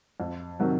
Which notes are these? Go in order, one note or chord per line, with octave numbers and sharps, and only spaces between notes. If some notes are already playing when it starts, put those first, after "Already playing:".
F2
C3 D#3 F#3